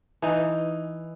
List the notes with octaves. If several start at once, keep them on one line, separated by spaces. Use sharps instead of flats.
E3 D#4